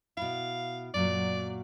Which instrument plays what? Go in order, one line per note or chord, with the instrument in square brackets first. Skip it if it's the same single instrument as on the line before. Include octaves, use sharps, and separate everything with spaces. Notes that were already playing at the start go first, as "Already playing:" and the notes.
[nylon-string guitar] B2 E4 [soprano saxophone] F5
[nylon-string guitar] F#2 A#2 F#3 [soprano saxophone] D5